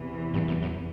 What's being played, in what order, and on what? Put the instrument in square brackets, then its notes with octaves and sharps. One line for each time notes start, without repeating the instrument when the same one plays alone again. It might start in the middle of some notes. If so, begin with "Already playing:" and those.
Already playing: [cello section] E2 C3 E3
[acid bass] G2
F#2
F#2